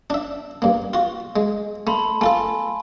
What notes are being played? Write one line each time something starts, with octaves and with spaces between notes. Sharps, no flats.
D4 E5
G2 A#3
F4 F#4
G#3
A3 A5 B5 C6
A3 F4 A4 G#5